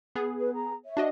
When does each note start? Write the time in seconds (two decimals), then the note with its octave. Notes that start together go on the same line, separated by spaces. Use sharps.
0.15 B3 G#4
0.39 B4
0.54 A#5
0.85 C#5 E5
0.97 D4 F#4 D#5